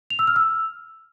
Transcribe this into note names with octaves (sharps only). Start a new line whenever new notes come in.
F7
E6
F6
E6